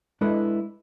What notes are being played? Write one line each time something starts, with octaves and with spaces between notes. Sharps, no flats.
G#3 D4 E4 A4 B4 D#5